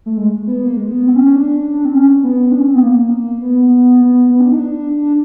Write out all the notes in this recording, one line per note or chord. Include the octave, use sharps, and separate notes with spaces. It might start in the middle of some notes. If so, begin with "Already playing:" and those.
A3
G#3
B3
A#3
G#3
B3
C4
C#4
C#4
D4
C4
C#4
B3
D4
C#4
C4
B3
A#3
B3
B3
B3
D4
D#4
D4